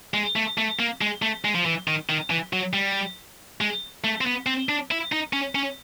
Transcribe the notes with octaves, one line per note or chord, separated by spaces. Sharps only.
G#3
A3
A3
A#3
G#3
A3
G#3
F3
E3
D#3
D#3
E3
F#3
G3
G#3
A3
C4
B3
C4
D4
E4
D#4
C#4
C#4